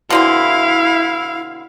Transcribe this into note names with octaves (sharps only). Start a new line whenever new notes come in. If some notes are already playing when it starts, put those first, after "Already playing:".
B2 D3 C4 E4 F5